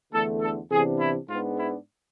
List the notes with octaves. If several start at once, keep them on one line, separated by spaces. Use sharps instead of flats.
E2 D3 A3 A4
A4
C3 E3 B3 D4 G#4
E4
G#2 G#3 B3 D4 F4
E4